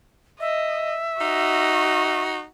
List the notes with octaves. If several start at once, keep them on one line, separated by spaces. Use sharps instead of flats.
D#5 E5
D#4 F#4